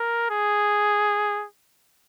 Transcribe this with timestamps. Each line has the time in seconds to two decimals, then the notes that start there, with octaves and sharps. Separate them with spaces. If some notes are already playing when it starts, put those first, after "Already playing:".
Already playing: A#4
0.31 G#4